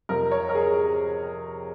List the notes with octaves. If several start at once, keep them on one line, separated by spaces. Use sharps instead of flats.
F2 C3 F3 A#4
C#5
A#4
G#4